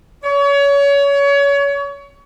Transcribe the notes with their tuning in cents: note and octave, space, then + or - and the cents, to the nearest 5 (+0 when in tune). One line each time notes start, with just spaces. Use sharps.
C#5 +30